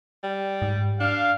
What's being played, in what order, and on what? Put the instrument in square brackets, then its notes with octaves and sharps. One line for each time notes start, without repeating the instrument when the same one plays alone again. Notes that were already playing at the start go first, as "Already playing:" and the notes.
[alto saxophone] G3
[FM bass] G#2
[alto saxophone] D4 [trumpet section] F5